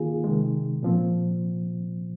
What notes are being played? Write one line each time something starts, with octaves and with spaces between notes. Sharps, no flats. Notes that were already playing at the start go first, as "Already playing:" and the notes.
Already playing: D#3 A#3 F4 G#4
C3 D#3 G#3
A#2 F3 C4